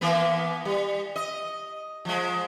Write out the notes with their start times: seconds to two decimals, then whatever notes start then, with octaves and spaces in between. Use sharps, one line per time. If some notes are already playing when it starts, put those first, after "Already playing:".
0.01 E3 A#3 B3
0.65 G3
1.16 D#5
2.05 F3 G#3